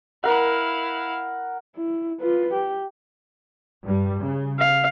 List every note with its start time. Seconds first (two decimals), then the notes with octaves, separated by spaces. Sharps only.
0.24 E4 A#4 F5 F#5
1.76 E4
2.20 F4 B4
2.54 G4
3.83 G2 G3
4.19 C#3
4.59 F5